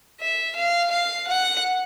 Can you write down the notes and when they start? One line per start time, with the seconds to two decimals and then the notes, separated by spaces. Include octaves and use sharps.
0.21 E5
0.56 F5
0.91 F5
1.27 F#5